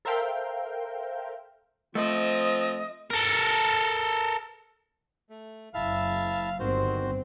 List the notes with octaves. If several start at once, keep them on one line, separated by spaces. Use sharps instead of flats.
A4 A#4 C5 E5 F5 G5
F3 A3 C4 D#5
A4 A#4
A3
F#1 E4 E5 F5 A5
G1 D#3 C4 F#4 C5